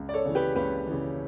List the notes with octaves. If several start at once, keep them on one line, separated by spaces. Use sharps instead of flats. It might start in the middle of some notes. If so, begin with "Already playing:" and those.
Already playing: C#2
D5
A4 C#5
C#3 E3
G4 B4
C#2 G4 B4
E3
C#3